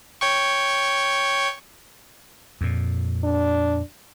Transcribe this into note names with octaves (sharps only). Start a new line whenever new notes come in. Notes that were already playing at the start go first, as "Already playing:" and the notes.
C#5 G5 C#6
F2 A#2
D4